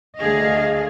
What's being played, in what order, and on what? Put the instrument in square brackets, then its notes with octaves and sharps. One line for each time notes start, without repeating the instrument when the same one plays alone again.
[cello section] D2 D3 A3 G#4 D#5 F5